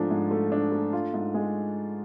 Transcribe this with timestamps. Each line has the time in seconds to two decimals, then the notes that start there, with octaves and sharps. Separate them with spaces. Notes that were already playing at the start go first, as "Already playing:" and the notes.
Already playing: G#2 F3 A3 D4
0.11 G#2
0.31 A3
0.52 D4
0.72 A3
0.93 F4
1.14 G#2
1.34 G#3